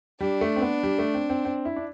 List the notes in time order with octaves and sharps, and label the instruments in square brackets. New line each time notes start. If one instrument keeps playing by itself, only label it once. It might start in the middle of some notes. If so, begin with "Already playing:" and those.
[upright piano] G3 [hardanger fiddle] D4
[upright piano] A3
C4
B3
G3
A3
C4
C4
C4
E4
D4